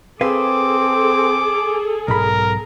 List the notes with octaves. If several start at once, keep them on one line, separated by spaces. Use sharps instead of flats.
C4 G#4 A4 B4 F5 D6
B1 G#2 A#4 B5